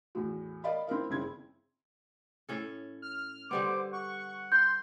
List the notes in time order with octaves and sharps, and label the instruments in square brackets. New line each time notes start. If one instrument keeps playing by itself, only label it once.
[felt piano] E2 A2 F#4
A#4 D5 D#5 F5 B5
C4 E4 A#4 F5
G1 C#3 C4 E4 G#6
[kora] A2 C#4 A4
[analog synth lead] F6
[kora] D3 G3 B3 [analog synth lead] C5 [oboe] D6
[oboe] F#5 [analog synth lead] C#6
[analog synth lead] C6 [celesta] G6